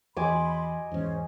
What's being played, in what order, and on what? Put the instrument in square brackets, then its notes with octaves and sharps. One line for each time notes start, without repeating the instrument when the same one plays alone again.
[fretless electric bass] E2 [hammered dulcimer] D#5 G#5 D6 [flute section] B5 C6
[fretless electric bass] E2 G#2 [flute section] C#4 C5